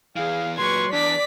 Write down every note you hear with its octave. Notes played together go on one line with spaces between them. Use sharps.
E2 E3 G#4 F5
A#2 F#3 B4 C6 C#6 G#6
E2 D4 D5 D6 B6